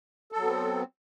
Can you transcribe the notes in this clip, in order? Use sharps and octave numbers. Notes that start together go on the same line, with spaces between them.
F#3 B3 C4 A4